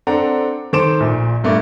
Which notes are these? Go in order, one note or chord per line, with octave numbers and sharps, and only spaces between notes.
C4 D4 A4 F#5 A#5
D#3 A4 C5 D6 D7 E7
A#1 A#2
G2 A3 A#3